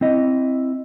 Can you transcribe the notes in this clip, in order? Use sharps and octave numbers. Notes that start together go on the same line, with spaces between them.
C4 E4 D#5